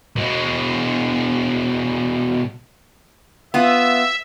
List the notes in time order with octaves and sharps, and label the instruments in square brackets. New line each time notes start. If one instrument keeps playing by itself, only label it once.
[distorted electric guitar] B2 G#3
[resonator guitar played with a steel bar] B3 F4 [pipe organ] E5